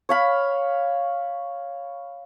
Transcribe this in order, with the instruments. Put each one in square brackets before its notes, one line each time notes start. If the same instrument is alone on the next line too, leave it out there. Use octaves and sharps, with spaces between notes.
[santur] C#5 F5 B5